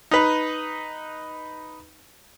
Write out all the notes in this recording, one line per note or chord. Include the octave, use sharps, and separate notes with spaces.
D#4 B4